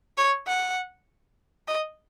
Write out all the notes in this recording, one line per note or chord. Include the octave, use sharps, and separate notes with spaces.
C#5
F#5
D#5